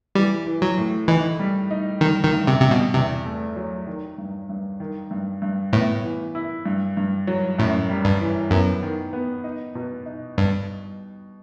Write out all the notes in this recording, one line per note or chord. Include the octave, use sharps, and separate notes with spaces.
E3 G3
E3
F#3
A2
E3 D#4
G3
D#4
D#3 G3
D#3
G2
C3
G2 C3
B2
E2 C3
A3
F#3
D#3
G2
G2
D#3
G2
G2
A2 B3
E3
E4
G2
G2
F#3
F#2 A2
G3
G2
E3
F#2 B3
D#3
B3
D#4
B2
D#4
G2 G3